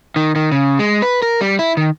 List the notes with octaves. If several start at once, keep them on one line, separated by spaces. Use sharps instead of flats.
D#3
D#3
C#3
G#3
B4
A#4
G3
E4
D#3